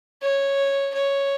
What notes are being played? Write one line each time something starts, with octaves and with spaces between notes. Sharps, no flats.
C#5
C#5